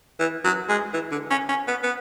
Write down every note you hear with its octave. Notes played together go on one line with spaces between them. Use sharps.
E3
F#3
G#3
E3
D3
C#4
C#4
B3
B3